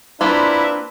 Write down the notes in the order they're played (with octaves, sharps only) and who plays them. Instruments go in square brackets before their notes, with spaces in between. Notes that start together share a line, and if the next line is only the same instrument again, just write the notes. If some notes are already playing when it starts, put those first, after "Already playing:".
[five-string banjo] A#3 C4 F4 [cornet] D4 [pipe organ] E4 E5 [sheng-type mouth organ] B4